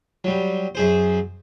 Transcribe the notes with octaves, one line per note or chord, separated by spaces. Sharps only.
F#3 G3
F#2 G#4 C5